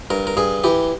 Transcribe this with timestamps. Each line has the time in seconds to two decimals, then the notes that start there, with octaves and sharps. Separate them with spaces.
0.10 G2 A#4
0.27 A#4
0.37 G2 G#4
0.64 E3 G4